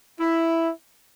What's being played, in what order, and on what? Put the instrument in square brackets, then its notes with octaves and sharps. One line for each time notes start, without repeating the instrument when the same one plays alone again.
[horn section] E4